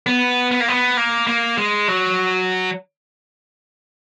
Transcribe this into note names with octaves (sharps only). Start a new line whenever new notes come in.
B3
B3
A#3
B3
A#3
A#3
G#3
F#3